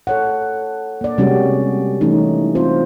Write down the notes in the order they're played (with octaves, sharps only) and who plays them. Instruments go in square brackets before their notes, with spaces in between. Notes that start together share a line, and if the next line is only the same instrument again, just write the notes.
[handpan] A4 C#5 F#5
A#3 D5
C3 G3 G#3 C#4 F#4 G4
E3 A3 C#4 D#4
C4 F4 C5